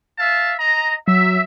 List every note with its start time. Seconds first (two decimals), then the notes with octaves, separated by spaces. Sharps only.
0.19 E5 F5 A5
0.59 D#5 A#5
1.08 F#3 E5